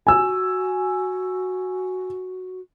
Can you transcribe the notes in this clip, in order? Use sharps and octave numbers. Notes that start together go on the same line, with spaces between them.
F#4 G#5 E6